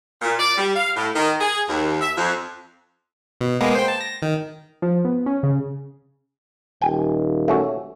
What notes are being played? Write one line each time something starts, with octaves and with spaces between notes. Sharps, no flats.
A#2
D5
G3
F5
A2
D#3
G#4
D#2
E5
F2
B2
G#3 A#3 B3
C5 G5
A5
A#6
D#3
F3
B3
C#4
C#3
D#1 G5 G#5
A3 C#4 F#4